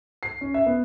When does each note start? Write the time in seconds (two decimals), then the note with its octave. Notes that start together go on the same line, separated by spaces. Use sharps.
0.23 C7
0.41 C#4
0.54 E5
0.66 B3